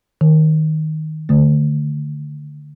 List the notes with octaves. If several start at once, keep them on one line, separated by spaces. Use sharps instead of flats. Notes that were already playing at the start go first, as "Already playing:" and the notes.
D#3
D3 A3